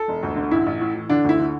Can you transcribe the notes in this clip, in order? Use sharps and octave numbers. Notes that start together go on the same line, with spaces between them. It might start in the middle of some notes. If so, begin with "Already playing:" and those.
Already playing: A4
E1
D2
D3
A1 E4
A1
A2
E3
D3 D4
D2 E4
D3